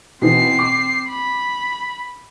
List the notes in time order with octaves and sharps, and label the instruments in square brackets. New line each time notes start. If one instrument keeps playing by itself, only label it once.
[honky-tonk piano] B2 E3 [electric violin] C4 C7
[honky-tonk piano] D6
[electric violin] B5